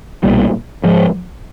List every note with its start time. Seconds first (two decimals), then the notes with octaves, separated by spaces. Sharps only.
0.23 B1 A#2 G3
0.84 G#2 F3 G#3